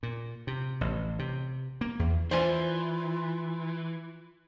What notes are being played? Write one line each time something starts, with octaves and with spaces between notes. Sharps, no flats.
A#2
C3
A1
C3
A#3
E2
E3 F4 C5 D5 G#5